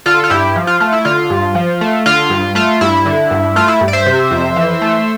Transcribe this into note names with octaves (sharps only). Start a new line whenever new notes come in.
D3 F4 A4
F4
G2 E4 G4
F3
F4
A3 F4
E4
D3 F4
G2
F3
A3
D3 F4
G2
A3 F4
G2 E4
D3
G2
A3 F4
E4
G2
D5
C5 E5
C3
F2
E3
A3